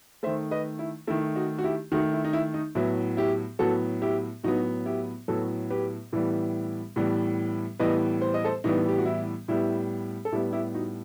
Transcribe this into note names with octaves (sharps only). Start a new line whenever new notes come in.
D#3 A3 C5 E5
B4 D#5
E4
D#3 A3 E4
D#4 F#4
F#4
E4 G4
D#3 A3 D#4 F#4
E4
D#4
E4
D#4
A2 F#3 B3 E4
E4 G4
A2 F#3 B3 F#4 A4
E4 G4
A2 F#3 B3 D#4 F#4
E4 G4
A2 F#3 B3 F#4 A4
G4 B4
A2 E3 G3 B3
A2 E3 G3 B3
A2 E3 G3 B3 B4 D#5
C5
D#5
A4 C5
A2 E3 G3 B3 D#4
G4
F#4
E4
A2 G3 B3 E4
A4
A2 G3 B3 E4 G4
E4 G4
D#4 F#4